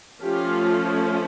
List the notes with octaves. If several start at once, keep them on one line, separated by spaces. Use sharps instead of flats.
F3 A3 C#4 F4 G4